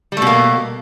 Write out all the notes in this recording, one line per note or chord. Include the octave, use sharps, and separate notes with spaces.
B2 G3 A3 A#3